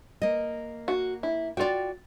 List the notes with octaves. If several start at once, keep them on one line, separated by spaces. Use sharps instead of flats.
A#3 D#5
F#4
E4
F4 F#4 D5 G5